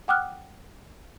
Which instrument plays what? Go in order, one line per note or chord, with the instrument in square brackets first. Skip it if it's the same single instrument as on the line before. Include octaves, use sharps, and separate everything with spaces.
[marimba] F#5 G5 D6 D#6 F6 F#6